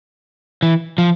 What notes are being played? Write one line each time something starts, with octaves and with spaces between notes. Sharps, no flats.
E3
F3